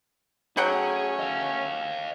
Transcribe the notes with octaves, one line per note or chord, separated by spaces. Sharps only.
F#3 A3 C#4 G#4 F#5 G5
D#5 F5